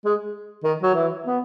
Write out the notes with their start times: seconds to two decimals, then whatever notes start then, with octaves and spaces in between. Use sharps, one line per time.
0.05 G#3
0.64 D#3
0.82 F#3
0.94 E3
1.27 B3